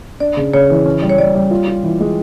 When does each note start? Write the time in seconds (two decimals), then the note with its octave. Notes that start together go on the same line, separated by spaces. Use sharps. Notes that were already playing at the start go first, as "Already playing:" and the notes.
0.20 D4 D5
0.37 C#3
0.54 C#3 C#5
0.70 E3
0.86 C#4
1.02 G3
1.10 C#5
1.18 G3 D5
1.35 G3
1.51 F4
1.68 F4
1.84 E3
2.00 G#3